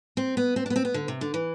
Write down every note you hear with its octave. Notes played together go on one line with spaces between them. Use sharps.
C4
B3
C4
D4
B3
C4
B3
D3
C3
D3
E3